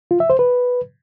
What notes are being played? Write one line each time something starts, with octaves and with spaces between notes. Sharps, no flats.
F4
E5
C5
B4